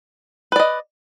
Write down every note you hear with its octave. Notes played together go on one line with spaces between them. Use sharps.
B4 D5 D#5